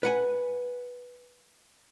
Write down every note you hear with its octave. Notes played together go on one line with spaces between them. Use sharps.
B4 F#5 G#5